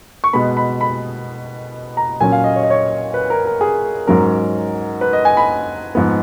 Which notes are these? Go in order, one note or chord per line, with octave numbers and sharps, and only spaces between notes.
C#6
B2 G#3 B3 B5
B5
B5
A#5
A#2 F#3 C#4 G#5
F5
D#5
C#5
D#5
C#5
B4
A#4
A#4
G#4
G#2 F#3 C#4 A#4
B4
D#5
G#5
B5
G#2 F3 B3